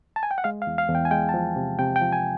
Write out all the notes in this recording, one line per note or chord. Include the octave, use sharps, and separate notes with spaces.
A5
G#5
G5
F#5
G#3 F5
F5
E2
F5
E2
G5
G#5
G#3 G5
A5
F3
C3
C3 G5
G5
F3
G#5